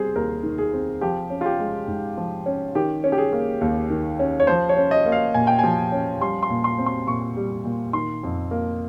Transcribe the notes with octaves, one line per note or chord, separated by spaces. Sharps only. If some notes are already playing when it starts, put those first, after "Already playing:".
Already playing: G3 C4 G#4 C5
D#2 A#4
D#3
G#4
C4
F3 G4
C#4
F4
G4
G#3
G#2
F3
C#4
D#3 G4
C#4
G4
G#4
A#3
D#2
D#3
C#4
C#5
F3 C5
C#5
C#4
D#5
A#3
F5
A#2 G#5
G5
F3 G#5
C#4
G3 C6
C6
A#2
C6
C4
C6
A#2 C#6
G3
A#2
D#3 C6
F2
A#3